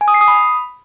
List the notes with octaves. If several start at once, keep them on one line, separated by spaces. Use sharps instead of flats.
G#5
D#6
C7
D#6
B5